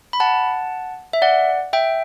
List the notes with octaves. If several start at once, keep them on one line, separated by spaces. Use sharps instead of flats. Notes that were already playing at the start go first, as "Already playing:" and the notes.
B5
F#5 A5
E5
D5 F#5
E5 G5